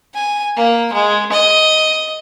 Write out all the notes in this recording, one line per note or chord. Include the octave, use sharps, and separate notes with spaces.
G#5
A#3
G#3
D#5